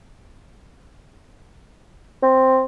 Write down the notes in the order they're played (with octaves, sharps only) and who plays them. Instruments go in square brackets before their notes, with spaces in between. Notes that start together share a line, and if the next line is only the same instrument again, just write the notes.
[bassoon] C4